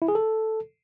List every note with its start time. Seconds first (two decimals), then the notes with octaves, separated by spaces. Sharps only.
0.02 E4
0.08 G#4
0.15 A4